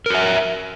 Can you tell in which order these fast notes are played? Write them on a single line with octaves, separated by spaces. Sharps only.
A#4 F#4 E5